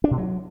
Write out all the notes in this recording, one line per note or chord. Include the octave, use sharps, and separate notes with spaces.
D4
B2
F#3